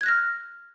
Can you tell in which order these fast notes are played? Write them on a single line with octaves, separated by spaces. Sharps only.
G#6 F#6 A#6 F6